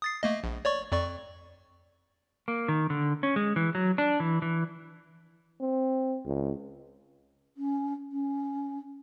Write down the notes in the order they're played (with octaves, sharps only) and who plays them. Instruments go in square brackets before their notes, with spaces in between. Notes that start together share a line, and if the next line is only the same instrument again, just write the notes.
[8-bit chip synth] D#6 A6 C7
A3 A#3 D#5
A#1
C#5 D5 C#6
F2 D5 C#6
[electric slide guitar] A#3
D#3
D3
C#4
G#3
E3
F#3
D4
E3
E3
[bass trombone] C4
C#2
[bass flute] C#4
C#4